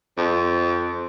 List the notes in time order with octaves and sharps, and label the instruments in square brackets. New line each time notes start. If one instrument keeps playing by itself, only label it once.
[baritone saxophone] F2